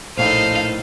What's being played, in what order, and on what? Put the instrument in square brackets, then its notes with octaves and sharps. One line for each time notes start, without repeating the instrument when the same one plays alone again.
[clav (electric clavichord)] A#1 A2 [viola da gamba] D#4 A4 [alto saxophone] C5 [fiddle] F5